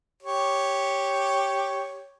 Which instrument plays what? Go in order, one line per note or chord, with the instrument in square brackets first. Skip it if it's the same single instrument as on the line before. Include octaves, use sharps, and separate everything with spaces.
[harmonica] G4 C#5